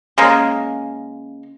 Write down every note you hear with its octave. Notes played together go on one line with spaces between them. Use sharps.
C#3 G#3 A#3